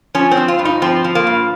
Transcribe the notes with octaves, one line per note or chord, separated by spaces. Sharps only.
F3 C#4
C4
F3
F4
G2
D#4
F3 C4
F3
A#3
G2